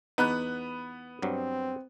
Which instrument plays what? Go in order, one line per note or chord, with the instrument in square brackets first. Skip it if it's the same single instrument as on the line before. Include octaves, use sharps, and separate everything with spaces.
[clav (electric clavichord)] E2 D#4 [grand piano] B3 B5 F#6
[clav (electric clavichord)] G2 F#3 [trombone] C4